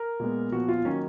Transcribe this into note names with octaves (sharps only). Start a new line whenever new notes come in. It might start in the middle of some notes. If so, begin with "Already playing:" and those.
Already playing: A#4
A#2 G#3 B3
A#2 F3 B3 F#4
F4
D#3 F#3 A#3 C#4